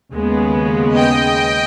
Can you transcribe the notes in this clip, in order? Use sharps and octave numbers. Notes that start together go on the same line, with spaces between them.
D#2 C#3 G#3 B3
D#5 G5